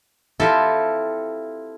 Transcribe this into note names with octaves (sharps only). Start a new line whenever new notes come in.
C4 E4 F4 G4 A4 A5